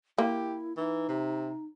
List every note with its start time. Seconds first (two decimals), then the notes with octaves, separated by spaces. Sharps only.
0.18 A#3 E4 G4
0.77 E3 D#4
1.09 C3